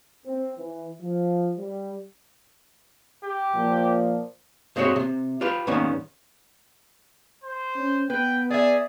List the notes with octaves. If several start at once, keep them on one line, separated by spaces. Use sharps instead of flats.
C4
E3
F3
G3
G4
A#2 F3
G2 G#3 C4 F#4 C#5
C3
F4 G4 B4
D#2 G#2 D#3 G3 B3 C#4
C5
C#4
B3 B4 G5
G#4 D5 E5